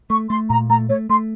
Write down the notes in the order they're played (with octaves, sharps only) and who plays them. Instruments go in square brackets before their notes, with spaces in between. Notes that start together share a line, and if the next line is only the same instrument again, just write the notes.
[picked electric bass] A3 [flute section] C#6
[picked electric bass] A3 [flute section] C6
[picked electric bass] A#2 [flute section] A#5
[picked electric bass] A3 [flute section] A#5
[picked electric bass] A3 [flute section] C#5
[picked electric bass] A3 [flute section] C6